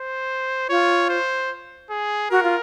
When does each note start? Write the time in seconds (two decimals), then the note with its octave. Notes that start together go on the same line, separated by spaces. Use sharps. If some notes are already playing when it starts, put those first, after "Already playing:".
Already playing: C5
0.69 F4 C#5
1.10 C5
1.90 G#4
2.31 F#4 A#4
2.43 F4